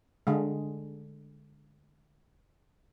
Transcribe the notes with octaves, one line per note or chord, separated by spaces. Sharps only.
D3 G#3